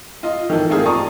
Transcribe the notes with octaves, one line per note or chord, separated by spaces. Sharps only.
F4 D#5
D#3 E3 A4
A3 A#3 C4 F4 G4 G#4
D5 A5 A#5 C#6 D#6